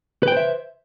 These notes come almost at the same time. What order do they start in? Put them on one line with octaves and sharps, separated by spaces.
B4 G5 C5 E5